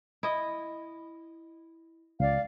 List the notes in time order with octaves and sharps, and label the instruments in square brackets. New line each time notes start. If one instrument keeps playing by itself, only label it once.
[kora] E4 D#5
[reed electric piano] C#2 [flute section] D5 F5